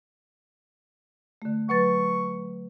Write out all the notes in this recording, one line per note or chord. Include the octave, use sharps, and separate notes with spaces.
D3 A3
F#3 B4 C#6 A6